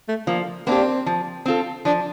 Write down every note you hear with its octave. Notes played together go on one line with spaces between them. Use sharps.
A3
F3 A#3
A#3 C4 D4 G4
F3
C4 F4 A4
F3 D4